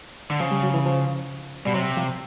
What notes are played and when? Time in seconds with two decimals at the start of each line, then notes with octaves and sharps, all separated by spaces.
0.31 D3
0.40 C#3 F3
0.51 G3
0.63 F#3
0.74 E3
0.85 F3
1.65 B2 G3
1.74 C3 F#3
1.97 F3